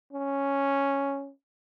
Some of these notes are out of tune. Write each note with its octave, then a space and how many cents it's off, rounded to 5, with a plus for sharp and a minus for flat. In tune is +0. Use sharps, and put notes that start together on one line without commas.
C#4 +0